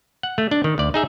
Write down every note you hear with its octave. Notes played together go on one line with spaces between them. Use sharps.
F#5
A3
D4
D#3
D2 D5
D#4 G#4 E5